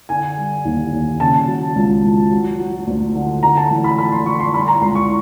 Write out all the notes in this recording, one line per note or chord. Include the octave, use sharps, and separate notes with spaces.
D3 G#5
G3
D#2
D#2
C#3 A5
F#3
C#2
C#2
F#3
F#3
D2
D3
D3 A#5
A5
A1
B5
F3 B5
C6
D3 C#6
C6
G3 B5
A#5
C#2 C6
C#6